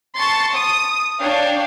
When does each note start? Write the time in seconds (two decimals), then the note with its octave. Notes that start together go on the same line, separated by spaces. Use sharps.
0.17 A5 C6 C#6 A6 C#7
0.53 D#6
1.19 D4 C#5 F5 G5